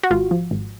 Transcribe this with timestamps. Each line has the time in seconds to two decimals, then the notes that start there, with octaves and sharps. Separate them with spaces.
0.03 F#4
0.11 G#1 F4
0.31 F3
0.51 G#1